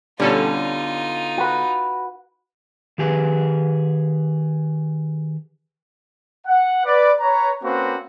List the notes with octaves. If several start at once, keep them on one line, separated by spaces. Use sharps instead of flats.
B2 D3 G3 C#4 D#4 F4 A4
F#4 B4
D#3 G4 G#4 B4
F#5
B4 D5
B4 C#5 A#5
A#3 C4 C#4 F#4 B4 C5